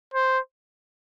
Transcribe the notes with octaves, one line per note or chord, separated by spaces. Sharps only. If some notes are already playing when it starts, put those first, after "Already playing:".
C5